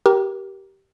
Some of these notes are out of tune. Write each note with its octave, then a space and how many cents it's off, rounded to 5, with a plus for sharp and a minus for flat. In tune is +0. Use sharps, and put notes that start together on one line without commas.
G4 -15 A#4 +15